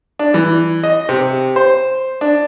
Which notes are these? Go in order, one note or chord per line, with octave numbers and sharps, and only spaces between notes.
D4
E3
D#5
C3
C5
D4